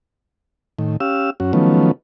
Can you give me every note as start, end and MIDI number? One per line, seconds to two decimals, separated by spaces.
0.79 0.97 45
0.79 0.97 51
1.00 1.30 61
1.00 1.30 67
1.00 1.30 77
1.00 1.30 88
1.40 1.53 42
1.40 1.53 61
1.40 1.53 66
1.53 1.91 51
1.53 1.91 53
1.53 1.91 54
1.53 1.91 57
1.53 1.91 59
1.53 1.91 61